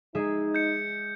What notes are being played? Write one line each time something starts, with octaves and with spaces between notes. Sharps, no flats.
G#3 D#4 G#4 E5
G6 C#7